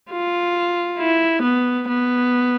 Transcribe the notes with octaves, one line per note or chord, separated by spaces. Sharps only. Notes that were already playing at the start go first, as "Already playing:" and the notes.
F4
E4
B3
B3